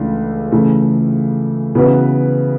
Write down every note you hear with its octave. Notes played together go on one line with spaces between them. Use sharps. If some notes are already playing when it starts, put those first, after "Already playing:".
Already playing: C#2 C#3 E3 A3 D4
C#3 E3 A3
C#3 E3 B3 F#4 B4